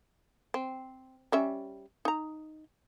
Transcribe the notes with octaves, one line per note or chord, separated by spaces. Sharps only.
C4
G3 C#4 E5
D#4 A#5